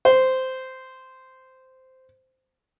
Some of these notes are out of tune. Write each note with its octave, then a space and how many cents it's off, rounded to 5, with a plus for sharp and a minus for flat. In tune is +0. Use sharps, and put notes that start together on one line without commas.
C5 -10